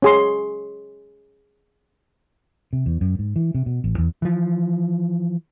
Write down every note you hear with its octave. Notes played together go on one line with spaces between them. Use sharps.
C#4 G#4 C6
C3
E2
F#2
G#2
E3
C3
B2
A1
E2
E3 F3